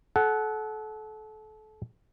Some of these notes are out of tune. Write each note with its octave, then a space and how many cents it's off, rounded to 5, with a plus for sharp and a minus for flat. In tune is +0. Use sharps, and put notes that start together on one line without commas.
A4 -30 F#5 +5